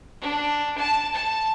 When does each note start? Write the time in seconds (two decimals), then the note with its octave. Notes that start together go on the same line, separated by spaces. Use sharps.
0.22 D4
0.78 A5
1.14 A5